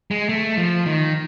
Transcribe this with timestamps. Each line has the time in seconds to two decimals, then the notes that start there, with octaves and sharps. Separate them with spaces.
0.11 G#3
0.29 A3
0.57 F3
0.86 D#3